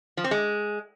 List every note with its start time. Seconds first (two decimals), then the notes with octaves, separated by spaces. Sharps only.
0.17 F3
0.24 C4
0.31 G#3